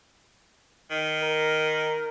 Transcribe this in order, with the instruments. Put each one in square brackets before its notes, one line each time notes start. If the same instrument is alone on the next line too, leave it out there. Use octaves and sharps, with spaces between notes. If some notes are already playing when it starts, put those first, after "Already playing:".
[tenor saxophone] D#3
[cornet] A#4